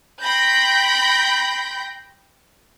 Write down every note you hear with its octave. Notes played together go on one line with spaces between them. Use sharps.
G5 B5 C6 G6 A#6